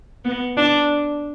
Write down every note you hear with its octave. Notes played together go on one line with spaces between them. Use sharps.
B3
D4